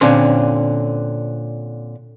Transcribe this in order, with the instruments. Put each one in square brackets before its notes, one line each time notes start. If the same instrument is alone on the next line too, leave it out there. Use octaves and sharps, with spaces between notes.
[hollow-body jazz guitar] A#2 D3 C4 C#4 C6